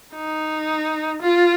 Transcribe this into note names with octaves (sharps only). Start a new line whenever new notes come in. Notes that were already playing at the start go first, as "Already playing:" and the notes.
D#4
F4